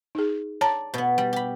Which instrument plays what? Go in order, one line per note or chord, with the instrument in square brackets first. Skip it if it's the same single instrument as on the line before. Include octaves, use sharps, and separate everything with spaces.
[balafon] D#4 G#4
[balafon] C#5 A5 A#5 [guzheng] D5
[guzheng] B2 B3
G3
G4 B5